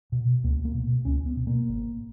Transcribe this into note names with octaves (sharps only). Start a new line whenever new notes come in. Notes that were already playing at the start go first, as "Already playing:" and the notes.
B2
C#2 A#3
A#3
B2
C#2 C#4
B3
B2
A#3
G#1